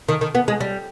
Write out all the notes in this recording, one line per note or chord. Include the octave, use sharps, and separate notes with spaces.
D#3
D#3
B3
G#3
G3